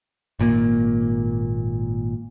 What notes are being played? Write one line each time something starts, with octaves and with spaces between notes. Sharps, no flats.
G#1 A#2 C#3 A#3